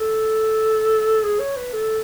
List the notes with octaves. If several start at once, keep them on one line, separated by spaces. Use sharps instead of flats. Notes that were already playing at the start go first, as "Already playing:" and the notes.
Already playing: A4
G#4
C#5
B4
A4